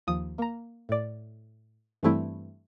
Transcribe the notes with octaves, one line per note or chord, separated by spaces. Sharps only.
D#2 F3 D#6
A#3 A#5
A2 D5
G2 E3 G3 A3 C4 E4